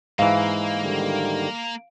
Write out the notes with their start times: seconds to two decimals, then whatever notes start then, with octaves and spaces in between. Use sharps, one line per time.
0.19 G#2 E3 A#3 F5
0.79 D3 D#3 G3